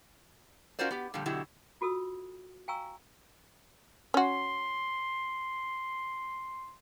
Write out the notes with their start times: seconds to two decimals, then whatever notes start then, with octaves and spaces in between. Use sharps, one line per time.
0.79 C#4 F4 F#4 A#4 C5 D5
0.91 B3 G4
1.14 A#2 D3 F3 G3
1.26 B2 D3 F#3 E4 G4
1.81 F4 F#4 A4 D#6 E6
2.68 F5 G5 G#5 A#5 C#6 E6
4.14 C#4 F#4 C6